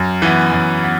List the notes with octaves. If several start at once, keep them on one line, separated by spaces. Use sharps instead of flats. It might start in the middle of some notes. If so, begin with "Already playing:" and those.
Already playing: F#2
E3 B3
F#2
B3